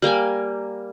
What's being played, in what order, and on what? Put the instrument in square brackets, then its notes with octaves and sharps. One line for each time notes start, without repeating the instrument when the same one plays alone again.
[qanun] G3 A#3 G5 G#5